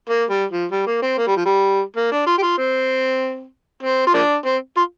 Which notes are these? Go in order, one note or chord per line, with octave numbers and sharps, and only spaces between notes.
A#3
G3
F3
G3
A#3
C4
A#3
G3
F3
G3
A#3
D4
F4
G4
F4
C4
C4
F4
F3 A#3 D4
C4
F4